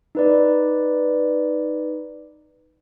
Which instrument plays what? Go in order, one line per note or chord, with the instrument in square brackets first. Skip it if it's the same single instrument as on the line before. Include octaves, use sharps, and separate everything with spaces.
[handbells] D#4 B4 D5